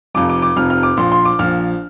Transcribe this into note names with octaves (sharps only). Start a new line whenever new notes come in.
F1 F2 C3 F3 D6
D6
D6
F1 F2 C3 F3 F6
F6
D6
A#1 A#2 F3 C6
C6
D6
A#1 A#2 F3 F6